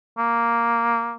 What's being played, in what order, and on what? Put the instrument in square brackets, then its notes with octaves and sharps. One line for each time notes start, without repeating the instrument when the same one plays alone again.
[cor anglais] A#3